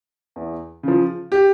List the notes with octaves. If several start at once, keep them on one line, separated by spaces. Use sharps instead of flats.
E2
C#3 F3
G4